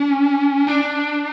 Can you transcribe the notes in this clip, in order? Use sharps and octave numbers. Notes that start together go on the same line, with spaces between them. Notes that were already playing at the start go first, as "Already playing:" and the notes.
Already playing: C#4
D4